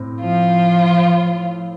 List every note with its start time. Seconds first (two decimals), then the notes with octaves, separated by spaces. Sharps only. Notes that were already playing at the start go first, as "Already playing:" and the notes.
Already playing: A2 C4
0.20 F3 F4